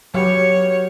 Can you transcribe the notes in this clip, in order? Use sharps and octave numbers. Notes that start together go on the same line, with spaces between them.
F#3 B3 G4 C#5 F5